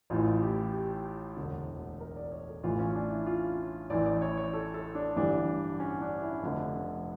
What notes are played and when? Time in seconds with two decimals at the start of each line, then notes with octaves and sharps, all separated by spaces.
0.10 A1 A2 E3 F4
0.42 G4
0.73 G4
1.37 E1 D2 D3
2.00 A#4
2.16 D5
2.32 C#5
2.47 A4
2.64 A1 A2 E3 F4
2.79 C#4
2.95 D4
3.10 E4
3.26 F4
3.90 A1 A2 E3 D5
4.06 D5
4.22 C#5
4.38 C#5
4.53 A4
4.74 A4
4.95 D4
5.16 G1 G2 E3 D4
5.80 C#4
6.01 D4
6.21 E4
6.42 F1 F2 D3